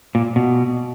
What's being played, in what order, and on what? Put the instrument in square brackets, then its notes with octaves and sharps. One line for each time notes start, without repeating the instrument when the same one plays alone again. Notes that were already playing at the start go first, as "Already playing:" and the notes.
[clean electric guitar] A#2
B2